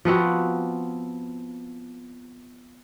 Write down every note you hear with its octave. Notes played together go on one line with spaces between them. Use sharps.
F3 B3 C4 F#4